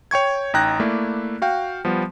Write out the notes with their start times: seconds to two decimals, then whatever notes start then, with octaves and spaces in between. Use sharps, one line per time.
0.11 C#5 G5 C#6 G#6
0.54 A1 D#4 G5 A#5 F#6 A#6
0.80 A3 A#3 E4 D5 E5
1.42 F#4 F5 G5
1.85 F3 G3 B3